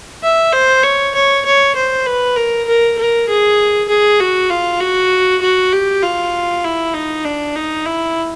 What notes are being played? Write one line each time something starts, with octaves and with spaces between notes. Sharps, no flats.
E5
C5
C#5
C#5
C#5
C5
B4
A#4
A#4
A#4
G#4
G#4
F#4
F4
F#4
F#4
G4
F4
E4
D#4
D4
D#4
E4